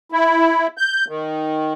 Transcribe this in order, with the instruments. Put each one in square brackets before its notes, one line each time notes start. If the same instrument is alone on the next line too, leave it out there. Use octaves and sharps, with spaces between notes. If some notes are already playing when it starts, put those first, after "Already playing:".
[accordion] E4
G6
D#3